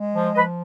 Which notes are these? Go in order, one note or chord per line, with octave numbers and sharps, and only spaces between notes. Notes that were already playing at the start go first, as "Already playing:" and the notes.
Already playing: G#3
F3
F3 B4 D#5